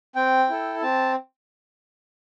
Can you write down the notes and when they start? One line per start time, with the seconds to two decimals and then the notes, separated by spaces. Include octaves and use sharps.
0.15 C4 G5
0.49 E4 A4
0.82 C4 A5